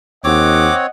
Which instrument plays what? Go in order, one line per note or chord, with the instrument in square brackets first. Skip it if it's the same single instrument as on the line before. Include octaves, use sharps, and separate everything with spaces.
[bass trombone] D#2 [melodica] C4 C#5 [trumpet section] D#5 F#5 [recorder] D6